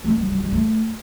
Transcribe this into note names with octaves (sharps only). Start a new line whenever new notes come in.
A3
F#3
F#3
G3
A3